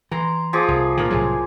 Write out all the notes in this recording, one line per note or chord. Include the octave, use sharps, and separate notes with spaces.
E3 A#5 C6
F3 G#4 D6
C2
A#2 D#3 A#4 G#5
C2 A2 F#3 G#4